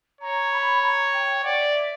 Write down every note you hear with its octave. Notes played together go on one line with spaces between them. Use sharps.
C#5 A#5
B5
A#5
G5
D5 F#5
E5
E5